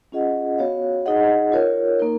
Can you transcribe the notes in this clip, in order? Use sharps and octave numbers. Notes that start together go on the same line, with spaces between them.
C#4 F4 G#4 D#5 F#5
B3 F#4 C#5 F5
D#4 G#4 D#5 F#5
F4 A#4 C#5
A#3 D#4 A#4